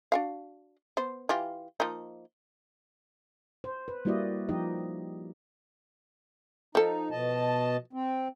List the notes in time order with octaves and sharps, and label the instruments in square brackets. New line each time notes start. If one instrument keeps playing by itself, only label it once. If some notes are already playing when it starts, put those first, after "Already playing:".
[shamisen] D4 F#4 F5
B3 C5
E3 F4 G4
F3 A#3 D#4
[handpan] C5
B4
G3 A#3 E4 F#4 D5 D#5
F3 D#4 G4 D#5
[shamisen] F3 A4 [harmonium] D#4
[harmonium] B2 D#5 A5
C4